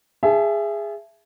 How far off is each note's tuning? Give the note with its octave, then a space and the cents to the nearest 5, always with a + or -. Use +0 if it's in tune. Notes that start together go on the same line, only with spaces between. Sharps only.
G#4 -10 E5 +20 A5 -35